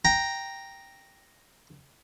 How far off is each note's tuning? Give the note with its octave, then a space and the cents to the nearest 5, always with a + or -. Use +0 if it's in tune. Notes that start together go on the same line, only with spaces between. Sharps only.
G5 +0 A#5 +0